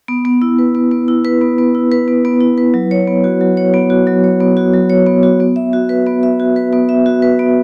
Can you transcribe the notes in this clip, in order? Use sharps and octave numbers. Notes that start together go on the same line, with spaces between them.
B3
B3
E4
B4
B3
B3
E4
B4
B3
B3
E4
B4
B3
B3
E4
B4
F#3
C#5
B3
F#4
F#3
C#5
B3
F#4
F#3
C#5
B3
F#4
F#3
C#5
B3
F#4
B3
E5
F#4
B4
B3
E5
F#4
B4
B3
E5
F#4
B4
B3